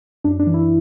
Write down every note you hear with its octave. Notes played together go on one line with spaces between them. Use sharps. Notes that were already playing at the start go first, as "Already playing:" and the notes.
F#2 D4
D4
E3
E4